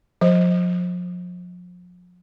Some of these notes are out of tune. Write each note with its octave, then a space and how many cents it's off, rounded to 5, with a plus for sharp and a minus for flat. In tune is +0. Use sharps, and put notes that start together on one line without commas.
F3 +40 C5 +10